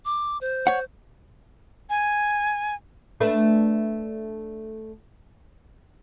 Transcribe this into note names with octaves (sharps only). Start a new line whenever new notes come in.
D6
C5
C#5 F#5
G#5
A3 D4 B4